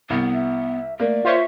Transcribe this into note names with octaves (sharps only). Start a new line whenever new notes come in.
C2 B3
E5
A3 A#3 D5
F4 C5 C#5 E5